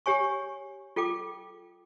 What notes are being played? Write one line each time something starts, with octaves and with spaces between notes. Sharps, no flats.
G4 C#5 G#5 C#6
F4 A4 G5 D6